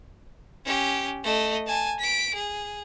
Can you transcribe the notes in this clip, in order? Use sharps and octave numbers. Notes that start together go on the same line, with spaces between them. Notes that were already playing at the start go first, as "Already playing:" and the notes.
C#4 G4
A3 D#5
G#5 A5
B6 D7
G#4